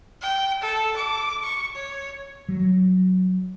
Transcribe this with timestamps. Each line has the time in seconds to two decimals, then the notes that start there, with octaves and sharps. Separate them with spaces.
0.22 G5
0.62 A4
0.97 D6
1.44 C#6
1.75 C#5
2.49 F#3